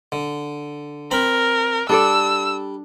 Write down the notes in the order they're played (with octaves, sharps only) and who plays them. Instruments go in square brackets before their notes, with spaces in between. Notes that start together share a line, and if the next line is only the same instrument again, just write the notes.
[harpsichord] D3
[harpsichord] C4 B5 [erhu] A#4
[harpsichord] G3 [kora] D4 A4 D5 [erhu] E6